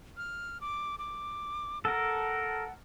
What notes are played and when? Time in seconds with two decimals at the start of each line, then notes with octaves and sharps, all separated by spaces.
0.17 F6
0.61 D6
0.99 D6
1.85 A4 A#4 F#5